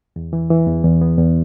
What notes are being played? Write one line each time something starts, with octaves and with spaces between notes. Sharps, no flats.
E2
E3
E3
E2
E2
B3
E2